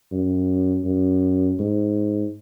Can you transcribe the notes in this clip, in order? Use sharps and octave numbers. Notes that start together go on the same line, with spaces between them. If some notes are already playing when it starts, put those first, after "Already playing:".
F#2
F#2
G#2